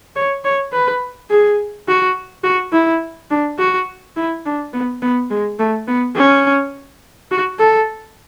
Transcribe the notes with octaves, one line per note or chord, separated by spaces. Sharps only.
C#5
C#5
B4
G#4
F#4
F#4
E4
D4
F#4
E4
D4
B3
B3
G#3
A3
B3
C#4
F#4
A4